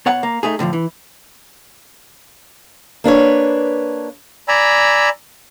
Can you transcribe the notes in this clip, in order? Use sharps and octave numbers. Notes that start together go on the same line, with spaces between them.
B2 C#5 F#5
A#3
A3 D#4 G#4
A2 D3 E3 F3
E3
A#3 D4 B4 C#5
D5 G#5 A#5 B5 E6